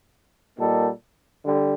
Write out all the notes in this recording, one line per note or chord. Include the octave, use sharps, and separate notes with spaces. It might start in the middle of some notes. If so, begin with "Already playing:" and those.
A#2 G3 A#3 D#4 A4
D3 G3